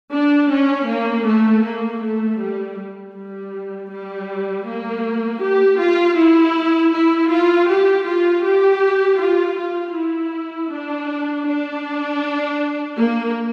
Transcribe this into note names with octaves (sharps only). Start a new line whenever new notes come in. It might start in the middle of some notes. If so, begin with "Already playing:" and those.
D4
C#4
A#3
A3
A#3
A3
G3
G3
G3
A#3
G4
F4
E4
E4
F4
G4
F4
G4
F4
F4
E4
D4
D4
A#3